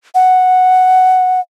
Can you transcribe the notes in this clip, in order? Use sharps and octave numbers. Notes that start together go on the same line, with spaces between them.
F#5